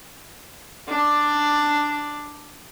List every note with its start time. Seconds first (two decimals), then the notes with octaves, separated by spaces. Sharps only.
0.88 D4 D5